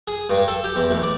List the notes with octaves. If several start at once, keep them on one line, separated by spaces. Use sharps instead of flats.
G#4
G2
A4
G4
E2
A1
D5